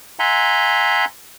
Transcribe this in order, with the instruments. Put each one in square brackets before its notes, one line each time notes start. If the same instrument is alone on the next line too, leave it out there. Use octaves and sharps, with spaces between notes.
[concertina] E5 F#5 G#5 A#5 C6